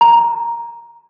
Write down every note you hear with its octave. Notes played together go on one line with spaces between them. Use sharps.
A#5